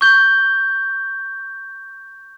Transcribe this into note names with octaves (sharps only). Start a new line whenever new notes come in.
C#6 G6 G7